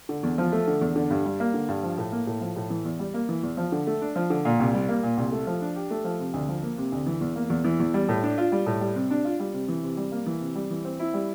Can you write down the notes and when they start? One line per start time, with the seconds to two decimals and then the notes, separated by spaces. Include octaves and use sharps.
0.09 D3
0.23 E2
0.38 F3
0.52 A3
0.67 D3
0.81 E2
0.96 D3
1.10 G2
1.25 G3
1.40 A#3
1.54 D3
1.69 G2
1.83 F3
1.98 A2
2.12 A#3
2.27 A2
2.41 F3
2.56 A2
2.70 E3
2.85 E2
2.99 G3
3.14 A#3
3.29 E3
3.43 E2
3.57 F3
3.72 D3
3.87 A3
4.01 D4
4.16 F3
4.30 D3
4.45 A#2
4.60 C2
4.74 G3
4.89 A#3
5.03 A#2
5.18 C2
5.32 A3
5.47 F3
5.61 D4
5.76 G4
5.90 A3
6.04 F3
6.19 C3
6.34 D2
6.48 F3
6.63 A#3
6.77 C3
6.92 D2
7.07 E3
7.21 E2
7.36 A#3
7.50 E2
7.64 E3
7.80 E2
7.94 G3
8.09 A2
8.23 D4
8.38 F4
8.52 G3
8.66 A2
8.81 G3
8.95 C3
9.11 D4
9.25 F4
9.40 G3
9.54 C3
9.68 E3
9.83 C3
9.97 G3
10.12 A#3
10.26 E3
10.41 C3
10.55 G3
10.70 E3
10.85 C4
11.00 E4
11.14 G3